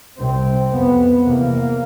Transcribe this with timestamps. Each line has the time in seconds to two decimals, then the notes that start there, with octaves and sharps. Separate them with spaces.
0.19 C2 C3 C4
0.72 F2 C3 B3
1.25 E2 C3 A#3